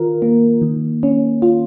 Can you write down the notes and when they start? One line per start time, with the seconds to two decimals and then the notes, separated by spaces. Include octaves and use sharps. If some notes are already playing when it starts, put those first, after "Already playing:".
Already playing: D#3 F4 A#4
0.22 A#3
0.62 D#3
1.03 C#4
1.42 F4